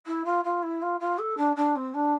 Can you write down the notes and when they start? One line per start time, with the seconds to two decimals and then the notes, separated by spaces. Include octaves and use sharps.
0.06 E4
0.24 F4
0.44 F4
0.62 E4
0.81 F4
0.99 F4
1.18 A4
1.36 D4
1.55 D4
1.75 C4
1.93 D4